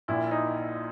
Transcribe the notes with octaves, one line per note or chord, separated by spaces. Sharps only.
A#1 A#2 E4
D#4